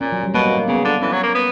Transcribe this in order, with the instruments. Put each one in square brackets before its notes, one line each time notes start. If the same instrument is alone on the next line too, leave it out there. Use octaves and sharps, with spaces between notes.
[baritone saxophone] A#2 [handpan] C#4
[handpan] F#3
G3
[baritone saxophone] B2 [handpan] A#3
[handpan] A#3
A#3
[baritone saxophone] C#3 [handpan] B3
[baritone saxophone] D3
[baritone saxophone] E3 [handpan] C#4
[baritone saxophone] F#3
A#3
B3